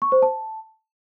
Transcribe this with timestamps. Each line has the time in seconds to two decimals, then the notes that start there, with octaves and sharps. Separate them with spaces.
0.02 C#6
0.12 C5
0.22 A5